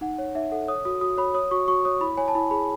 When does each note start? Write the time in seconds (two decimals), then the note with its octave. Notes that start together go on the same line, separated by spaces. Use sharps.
0.01 D#4 F#5
0.19 C#5
0.35 D#4 E5
0.52 A4 F#5
0.68 C#5 D#6
0.85 F#4 D#6
1.01 F#4 D#6
1.17 C#5 B5
1.34 C#5 D#6
1.51 F#4 C#6
1.68 F#4 C#6
1.85 C#5 D#6
2.01 E4 B5
2.18 C#5 G#5
2.28 A5
2.35 E4 B5
2.51 G#4 B5